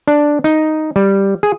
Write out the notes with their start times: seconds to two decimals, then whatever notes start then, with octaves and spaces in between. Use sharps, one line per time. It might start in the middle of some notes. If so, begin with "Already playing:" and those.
0.08 D4
0.44 D#4
0.96 G3
1.43 G#4